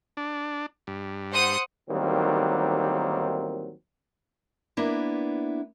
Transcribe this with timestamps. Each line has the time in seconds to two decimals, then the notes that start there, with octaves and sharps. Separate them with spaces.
0.17 D4
0.87 G2
1.33 C5 F#5 D#6
1.90 A1 D#2 D#3 F#3 G3 C4
4.77 A#3 B3 D4 E4